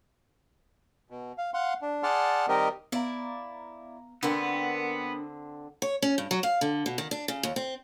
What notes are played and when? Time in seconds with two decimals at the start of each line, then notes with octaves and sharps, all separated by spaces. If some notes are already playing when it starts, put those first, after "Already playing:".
1.10 B2
1.38 F5
1.54 F5 F#5 C6
1.82 D4
2.03 G#4 D5 F#5 A5 C6 F6
2.48 D#3 G3 C4 G4 A#4 D#5
2.92 B3 E4 D5 F5 A#5
4.23 D3 B3 C4 D4 A#4 G5
5.82 C#5
6.02 C#4
6.18 G2
6.31 F#3
6.43 F5
6.61 D3
6.86 B2
6.98 D#3
7.11 D4
7.28 C#3
7.43 D#2
7.56 C4